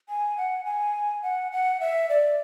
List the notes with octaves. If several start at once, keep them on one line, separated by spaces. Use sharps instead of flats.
G#5
F#5
G#5
F#5
F#5
E5
D5